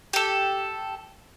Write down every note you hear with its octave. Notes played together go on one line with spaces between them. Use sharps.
G4 A4